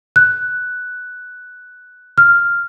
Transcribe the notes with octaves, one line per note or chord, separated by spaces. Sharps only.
F#6
F6